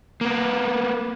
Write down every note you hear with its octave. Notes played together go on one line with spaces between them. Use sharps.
A#3 B3